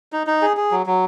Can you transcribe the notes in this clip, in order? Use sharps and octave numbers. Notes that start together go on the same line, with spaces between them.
D#4
D#4
G#4
G#4
F#3
F#3